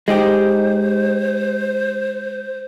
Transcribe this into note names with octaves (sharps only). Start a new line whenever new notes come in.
G#3 D#4 G4 C5